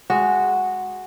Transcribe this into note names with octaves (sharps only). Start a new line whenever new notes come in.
G#3 F#4